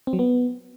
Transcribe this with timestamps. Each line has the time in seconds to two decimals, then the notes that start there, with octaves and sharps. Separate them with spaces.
0.07 C4
0.13 F#3
0.19 B3